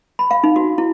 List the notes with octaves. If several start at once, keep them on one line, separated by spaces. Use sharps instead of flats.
B5
F5
D#4
F#4
E4